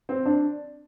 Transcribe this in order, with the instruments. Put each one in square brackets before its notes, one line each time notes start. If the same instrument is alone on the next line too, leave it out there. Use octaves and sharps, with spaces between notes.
[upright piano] C4
D4